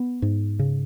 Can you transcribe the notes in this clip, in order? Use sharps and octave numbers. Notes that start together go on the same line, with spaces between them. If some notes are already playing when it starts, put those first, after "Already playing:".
Already playing: B3
G#2
C#3